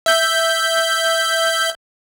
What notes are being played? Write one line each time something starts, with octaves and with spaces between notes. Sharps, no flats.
E5 G6